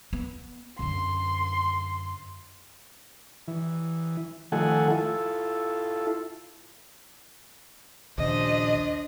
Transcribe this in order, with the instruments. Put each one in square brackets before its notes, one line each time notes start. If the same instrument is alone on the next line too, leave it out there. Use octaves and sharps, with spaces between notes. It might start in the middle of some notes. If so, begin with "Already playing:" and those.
[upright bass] B3
[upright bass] F#2 D3 [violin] C6
[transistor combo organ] E3
D#3 F3 A3 A4 F#5 G#5
E4 F4 A4
[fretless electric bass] A#1 D#2 C#3 [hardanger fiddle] D4 C5 [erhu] D#5